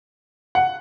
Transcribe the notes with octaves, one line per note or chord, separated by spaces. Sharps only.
F#5